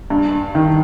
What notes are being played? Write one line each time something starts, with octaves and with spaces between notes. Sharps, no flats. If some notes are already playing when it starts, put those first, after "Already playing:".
G2
D#3